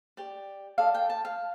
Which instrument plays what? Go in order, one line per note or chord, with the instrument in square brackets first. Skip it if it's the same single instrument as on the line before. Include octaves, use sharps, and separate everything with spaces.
[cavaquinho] G4 D5
F4 A4 D5 F5
G5
A5
F5